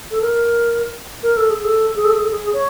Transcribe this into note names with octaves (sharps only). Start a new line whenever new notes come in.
A4
A#4
A#4
A4
G#4
A4
G#4
A4
G#4
A4
G#4
C#5